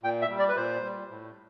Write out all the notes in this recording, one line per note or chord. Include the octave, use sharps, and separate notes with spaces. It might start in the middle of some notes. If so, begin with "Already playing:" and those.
A#2 G5
E5
G3
D5
B4
A#2 C5
G3
A2